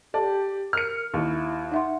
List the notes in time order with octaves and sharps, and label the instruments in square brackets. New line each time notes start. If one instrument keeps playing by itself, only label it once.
[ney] G4 [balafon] A4 A5 [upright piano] D5
[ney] A#4 [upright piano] F6 C#7
[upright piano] D#2 [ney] E4
[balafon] D#4 E5 C6 [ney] F#5